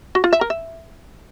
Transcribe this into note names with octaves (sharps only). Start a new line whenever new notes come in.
F#4
F4
E5
A#4
E5